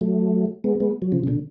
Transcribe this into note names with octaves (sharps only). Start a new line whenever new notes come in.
F#3 A3
G#3 B3
G#3 B3
F#3
C#3 F3
C#3
B2 D3